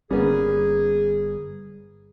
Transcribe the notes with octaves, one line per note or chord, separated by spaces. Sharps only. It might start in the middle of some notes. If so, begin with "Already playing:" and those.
G1 C2 G3 A#3 B3 C#4 G#4